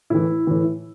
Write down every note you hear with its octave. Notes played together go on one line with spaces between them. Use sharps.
A2 E3 E4
A2 E3